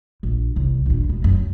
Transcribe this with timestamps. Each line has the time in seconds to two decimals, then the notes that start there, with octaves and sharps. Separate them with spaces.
0.23 A#1
0.56 C2
0.86 A#1 D#2
1.09 B1 G#3
1.24 F#2